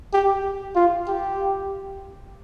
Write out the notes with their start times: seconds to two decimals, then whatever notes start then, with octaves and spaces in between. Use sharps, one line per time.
0.13 G4
0.76 F4
1.08 G4